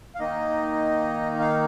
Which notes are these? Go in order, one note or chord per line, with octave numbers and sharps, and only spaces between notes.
F5
D#3 A#3 D#4 D#5
F5